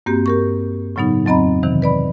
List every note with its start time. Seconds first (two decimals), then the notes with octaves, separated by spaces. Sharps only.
0.06 G2 A#3 C4 F#4 G4
0.26 G4 A#4 C#6
0.96 A2 C#3 F#3 B3 D#4
1.26 F2 F#3 C4 D#5 A#5 B5
1.63 C3 D#3 E3
1.82 B4 D5 B5